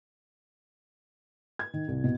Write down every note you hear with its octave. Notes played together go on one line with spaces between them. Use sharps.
G#6
D#3
C2
B2